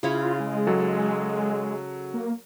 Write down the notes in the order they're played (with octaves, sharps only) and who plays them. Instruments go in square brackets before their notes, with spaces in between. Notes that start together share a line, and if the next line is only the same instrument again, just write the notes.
[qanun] C#3 E4 C#5 [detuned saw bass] F4
[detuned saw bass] G#3
[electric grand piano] F#3 A4
[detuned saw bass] A#3